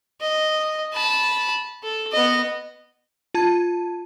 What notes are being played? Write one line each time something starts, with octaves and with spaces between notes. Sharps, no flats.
D#5
A5 B5
A4
B3 D#5
F4 A5 G#6 D#7